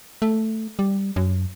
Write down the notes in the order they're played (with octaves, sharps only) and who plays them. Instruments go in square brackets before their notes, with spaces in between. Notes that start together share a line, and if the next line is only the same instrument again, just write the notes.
[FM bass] A3
G3
F#2